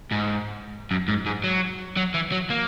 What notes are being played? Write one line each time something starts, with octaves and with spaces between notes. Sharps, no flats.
G#2
F#2
G#2
G#2
F#3
F#3
E3
F#3
A#3